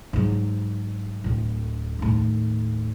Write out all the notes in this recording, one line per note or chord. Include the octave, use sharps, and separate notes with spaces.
G#2 F#3
D1 A2
D#2 A2